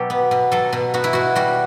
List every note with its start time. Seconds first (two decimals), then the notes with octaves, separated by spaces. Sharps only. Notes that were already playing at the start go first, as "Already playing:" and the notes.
Already playing: B2 F#3 G4 A4
0.10 B3
0.31 B2
0.52 F#3 A4
0.73 B2
0.94 B3 F#4
1.04 E4
1.13 B2 F#4
1.36 G3 F#4